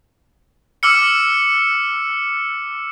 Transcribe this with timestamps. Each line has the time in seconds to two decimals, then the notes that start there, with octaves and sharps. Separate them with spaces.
0.83 D6 E6 F6 C#7